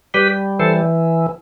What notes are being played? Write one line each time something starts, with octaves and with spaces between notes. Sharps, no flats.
G3 G4 B4
E3 A4 C5